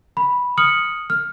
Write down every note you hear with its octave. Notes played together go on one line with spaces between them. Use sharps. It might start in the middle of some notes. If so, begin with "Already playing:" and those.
B5
D#6 F6 C#7 F#7
F6